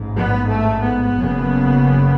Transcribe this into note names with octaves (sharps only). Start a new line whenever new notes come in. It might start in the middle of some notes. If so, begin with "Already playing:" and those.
Already playing: A1 G#2
B3
A3
B3
F#1 F#2 C#3